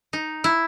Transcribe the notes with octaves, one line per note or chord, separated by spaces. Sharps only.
D#4
E4